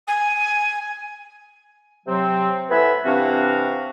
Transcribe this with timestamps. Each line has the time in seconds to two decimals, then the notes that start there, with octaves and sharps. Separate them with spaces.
0.07 G#5
2.06 C3 F#3 C4
2.70 A2 B3 B4 E5 G#5 B5
3.05 C3 E3 C4 D4 F#4 F5